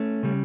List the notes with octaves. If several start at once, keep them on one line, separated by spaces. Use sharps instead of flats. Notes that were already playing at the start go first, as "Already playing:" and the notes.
Already playing: A3 C#4
C#3 G3